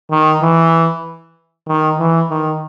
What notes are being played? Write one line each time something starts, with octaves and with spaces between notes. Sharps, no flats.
D#3
E3
D#3
E3
D#3